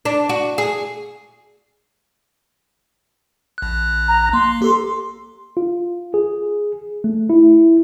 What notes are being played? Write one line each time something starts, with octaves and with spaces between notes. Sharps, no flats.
D4
F#4
G#4
A#1 F#6
A#5
A#3 C6
G4 A4
F4
G#4
A3
E4